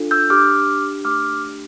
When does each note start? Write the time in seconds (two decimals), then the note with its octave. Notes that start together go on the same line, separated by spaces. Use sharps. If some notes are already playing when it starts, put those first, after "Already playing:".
Already playing: D4 F4 A4
0.11 E6 G6
0.29 D4 G4 D6 F6
1.05 A3 D4 G4 D6 F6